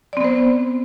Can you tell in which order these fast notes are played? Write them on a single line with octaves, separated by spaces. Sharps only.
D5 C4 B3 C5